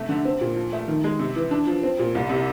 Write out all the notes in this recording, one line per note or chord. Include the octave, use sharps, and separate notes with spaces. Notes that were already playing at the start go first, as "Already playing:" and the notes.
Already playing: C3 A3
D3
C4
A#2
F3
A3
D#3
G#3
C3
E3
D4
F3
C4
A#2
C2
C3